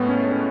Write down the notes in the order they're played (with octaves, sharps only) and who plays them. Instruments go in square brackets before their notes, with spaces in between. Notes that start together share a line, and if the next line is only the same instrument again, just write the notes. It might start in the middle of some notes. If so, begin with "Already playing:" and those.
Already playing: [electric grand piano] A2 G#3 A3 B3
C#4
C#4